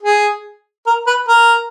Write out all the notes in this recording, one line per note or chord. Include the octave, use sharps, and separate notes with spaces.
G#4
A#4
B4
A#4